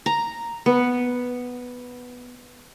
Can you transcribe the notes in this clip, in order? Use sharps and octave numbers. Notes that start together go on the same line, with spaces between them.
A#5
B3